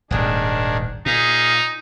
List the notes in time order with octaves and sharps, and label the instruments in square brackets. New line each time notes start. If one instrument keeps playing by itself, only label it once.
[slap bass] D#1 G#1 D#2 [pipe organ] D#3 D4 G#4
[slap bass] A#2 [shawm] D#4 [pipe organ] G#4 F5 G#5